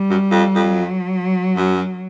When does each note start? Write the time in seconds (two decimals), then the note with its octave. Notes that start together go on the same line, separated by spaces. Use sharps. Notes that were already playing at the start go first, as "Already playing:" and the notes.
Already playing: G3
0.10 F#2
0.31 F2
0.55 F2
0.73 F#3
1.56 F#2